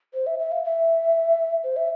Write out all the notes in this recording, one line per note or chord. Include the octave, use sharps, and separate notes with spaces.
C5
E5
E5
F5
E5
C5
E5